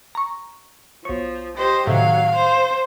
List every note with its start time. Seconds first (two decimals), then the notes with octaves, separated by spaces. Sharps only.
0.15 A#5 C#6
1.05 B1 F3 C#5
1.58 G4 C5 D#5
1.87 A2 C3 D#3 F#3 F5
2.35 C5